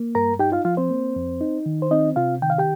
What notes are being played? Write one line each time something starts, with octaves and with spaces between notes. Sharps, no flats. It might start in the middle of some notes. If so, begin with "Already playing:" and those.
Already playing: A#3
G2 A#4 A#5
D#4 G4 G5
F4 F5
F3 F4 F5
C4 C5
A#3
F2
D#4
D#3
C5
C4 D#4 D#5
C3 F4 F5
D#3 G5
F5
G4 G5